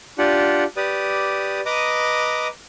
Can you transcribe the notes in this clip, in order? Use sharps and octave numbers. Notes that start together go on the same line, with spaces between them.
D4 F4 G4 F#5
G4 B4 D5 D#6
B4 D#5 A#5 D6 D#6